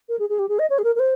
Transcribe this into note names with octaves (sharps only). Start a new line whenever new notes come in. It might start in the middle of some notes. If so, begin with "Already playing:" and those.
A#4
G#4
G#4
G4
G#4
D#5
C#5
G#4
A#4
A#4
C5